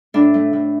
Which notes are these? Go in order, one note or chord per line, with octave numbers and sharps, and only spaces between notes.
A2 D4
A3
A2